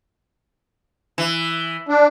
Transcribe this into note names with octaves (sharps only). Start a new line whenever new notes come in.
E3
D4